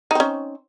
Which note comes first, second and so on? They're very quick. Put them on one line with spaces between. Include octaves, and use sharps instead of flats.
D#4 C4 C#4